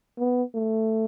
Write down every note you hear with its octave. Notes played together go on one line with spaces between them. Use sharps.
B3
A3